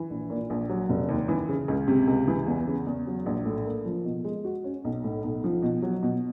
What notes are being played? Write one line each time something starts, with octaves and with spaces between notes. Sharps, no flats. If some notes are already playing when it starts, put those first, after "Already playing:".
Already playing: E3
A#1
A#2
A#1
F#3
F1
D#2
E3
C#3
C#2
C3
C#2
E3
E2
C#3
E2
F#3
A#1
A2
A#3
F3
B2
G#3
F#4
C#4
B1
A2
B1
F3
B2
F#3
B2